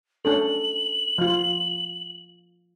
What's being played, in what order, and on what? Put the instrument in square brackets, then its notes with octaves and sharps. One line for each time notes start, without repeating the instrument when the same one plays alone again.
[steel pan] C#4 D4 A4 [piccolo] F#7
[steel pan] F3 F4